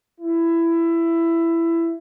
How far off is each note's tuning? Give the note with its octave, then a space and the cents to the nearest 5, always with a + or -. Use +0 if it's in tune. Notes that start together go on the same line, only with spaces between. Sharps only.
E4 +15